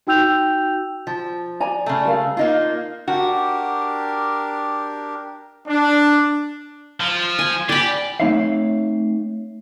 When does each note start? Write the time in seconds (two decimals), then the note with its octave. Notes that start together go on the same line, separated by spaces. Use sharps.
0.07 D#4 F#4 G5 E6 G6 F7
1.07 F3
1.60 D5 G#5 A#5
1.86 C#3 A3
2.05 A#4 F5
2.37 A#3 D#4 F4
3.08 D4 F#4 G4 A#4
5.68 D4
7.00 F3
7.39 G#5
7.69 G4 D5 B5
8.20 A3 C4 D#4 C#5 E5 F5